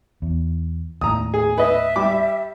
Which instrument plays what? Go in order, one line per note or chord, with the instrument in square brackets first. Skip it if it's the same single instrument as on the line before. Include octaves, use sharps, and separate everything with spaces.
[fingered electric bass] E2
[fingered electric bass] D#2 A2 [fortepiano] A#5 D#6
[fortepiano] G#4
[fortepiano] B4 D#5 [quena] E5
[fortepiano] G3 B5 D6